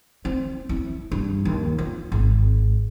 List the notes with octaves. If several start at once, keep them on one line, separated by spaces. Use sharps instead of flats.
C4
E4
G2
D#2
F4
G#1